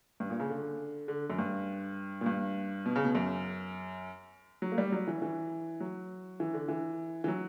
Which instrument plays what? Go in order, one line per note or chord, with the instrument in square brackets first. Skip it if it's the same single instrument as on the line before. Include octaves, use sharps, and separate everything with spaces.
[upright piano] G2
A#2
C#3
D3
D3
F#2
G2
A#2
G2
B2
C#3
B2
F#2
F#3
A#3
G3
F#3
E3
E3
F#3
E3
D3
E3
E3
F#3